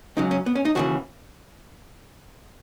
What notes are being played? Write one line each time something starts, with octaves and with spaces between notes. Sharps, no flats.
C#2 C#3 F#3 D#4
C#4
B3
C#4
D#4
D#2 C#3 E3 F#4